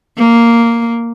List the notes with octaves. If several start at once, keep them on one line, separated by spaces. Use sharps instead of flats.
A#3